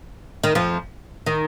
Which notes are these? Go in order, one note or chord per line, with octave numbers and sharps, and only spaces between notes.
D#3
F2 F3
D#3